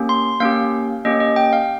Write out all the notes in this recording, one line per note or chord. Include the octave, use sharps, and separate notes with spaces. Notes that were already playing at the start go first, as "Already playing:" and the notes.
Already playing: A#3 C#4 G4
C6
A#3 C#4 G4 F5
A#3 C#4 G4 D#5
D#5
G5
F5